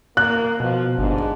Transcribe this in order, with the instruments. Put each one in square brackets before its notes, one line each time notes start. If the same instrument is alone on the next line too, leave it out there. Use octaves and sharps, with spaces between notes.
[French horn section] A#3 [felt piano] F#6
[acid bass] B2 [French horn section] F3
[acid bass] G1 [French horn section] G#2 D4